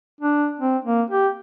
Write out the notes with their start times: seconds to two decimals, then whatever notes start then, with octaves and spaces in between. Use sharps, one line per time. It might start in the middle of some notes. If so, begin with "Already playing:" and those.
0.20 D4
0.59 C4
0.84 A#3
1.10 G4